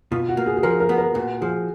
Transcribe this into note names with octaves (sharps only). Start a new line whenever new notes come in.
B2 F4
F#4
A#3
G#4
G#4
F3 A#4
A#4
B3
A#4
A#2 F#4
F3 G#4